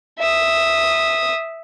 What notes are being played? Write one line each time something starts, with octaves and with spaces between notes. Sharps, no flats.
E5 D#6